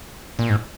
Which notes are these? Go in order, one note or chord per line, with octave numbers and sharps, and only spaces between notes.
A#2
G#2